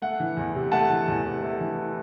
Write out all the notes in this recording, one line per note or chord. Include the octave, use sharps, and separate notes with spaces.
A3 F#5
E3
E2
C3
A3 F#5 A5
E3
E2
C3
A3
E3